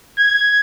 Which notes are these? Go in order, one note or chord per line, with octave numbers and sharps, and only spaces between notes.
G#6